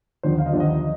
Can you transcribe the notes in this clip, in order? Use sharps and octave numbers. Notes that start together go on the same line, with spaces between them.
D#2 D3 F3 C5
F5
D#5
D#2 D3 F3 D5
D#5